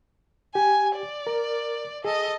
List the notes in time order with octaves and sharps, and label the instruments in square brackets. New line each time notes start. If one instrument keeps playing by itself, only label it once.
[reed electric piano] G4 [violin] G#5
[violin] D5
[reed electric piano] A#4
[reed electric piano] G#4 [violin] A4 D#5